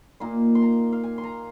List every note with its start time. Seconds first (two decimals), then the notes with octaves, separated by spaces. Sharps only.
0.20 A#2 A#3 D#4 C6
0.55 C6
0.62 A#5
0.92 F5
1.03 G#5
1.18 C6
1.23 A#5